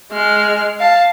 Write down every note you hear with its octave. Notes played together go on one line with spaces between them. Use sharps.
G#3 F6
F5 A5